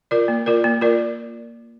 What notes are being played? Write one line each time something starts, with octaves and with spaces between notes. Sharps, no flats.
F4 A#4 D5
A#3
F4 A#4 D5
A#3
F4 A#4 D5